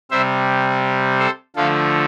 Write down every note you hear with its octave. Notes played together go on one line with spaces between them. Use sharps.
C3 G3 C5 E5
A4 C5
D3 F3 A3 F4 A4